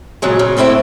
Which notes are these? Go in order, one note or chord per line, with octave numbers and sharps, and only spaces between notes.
A#2 C#3 F#3 G#3
C#3
A2 A3 C4 E4 G5